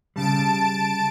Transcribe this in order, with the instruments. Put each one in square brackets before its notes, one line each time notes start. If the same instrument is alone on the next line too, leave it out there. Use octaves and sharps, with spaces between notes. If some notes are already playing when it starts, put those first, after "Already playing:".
[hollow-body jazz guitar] C#3 G3 [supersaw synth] A5 D7